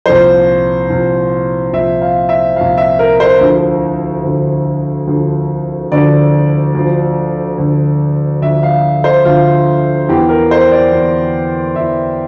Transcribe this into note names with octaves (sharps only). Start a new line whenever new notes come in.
C2 A#2 F3 C5
C2 A#2 F3
C2 A#2 F3 E5
F5
E5
C2 A#2 F3 F5
E5
A#4
C5
D2 D3 F3
D2 D3 F3
D2 D3 F3
D2 D3 F3 D5
D2 D3 F3
D2 D3 F3
D2 D3 F3 E5
F5
C5
D2 D3 F3 F4
E2 E3 G4
A#4
C5
D5
E2 E3
E2 E3 E5